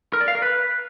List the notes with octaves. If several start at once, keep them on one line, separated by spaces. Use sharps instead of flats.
A#4
D5
F5
A#4
B4